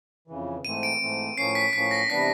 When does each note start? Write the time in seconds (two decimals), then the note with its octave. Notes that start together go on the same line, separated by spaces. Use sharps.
0.28 F2 C#3 E3
0.64 G#2 E3 A3 C4 D#7
0.83 D7
1.00 G#2 E3 A3 C4
1.37 A2 F3 A#3 C#4 C7
1.55 B6
1.73 A2 F3 A#3 C#4 B6
1.91 A#6
2.10 C3 E3 G3 B3 D4 B6